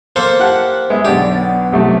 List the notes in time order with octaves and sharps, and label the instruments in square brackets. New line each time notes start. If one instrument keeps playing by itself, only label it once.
[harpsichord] A#3 A4 C5
[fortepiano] G4 F#5 A5
[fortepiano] G#3 B3 [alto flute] E5
[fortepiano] B1 D3 [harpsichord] G4 [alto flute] D5
[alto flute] B3
[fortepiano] B1 C3 A3